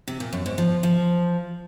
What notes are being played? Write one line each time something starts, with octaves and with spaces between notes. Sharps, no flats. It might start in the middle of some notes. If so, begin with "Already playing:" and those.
C3
A#2
F#2
G#2
F3
F3